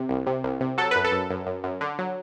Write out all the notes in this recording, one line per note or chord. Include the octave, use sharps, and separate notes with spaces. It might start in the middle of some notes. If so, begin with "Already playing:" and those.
Already playing: C3
C2
C3
C2
C3
F#3 A4
F#2 B4
A4
F#2
F#2
F#2
F#2
D3
F#3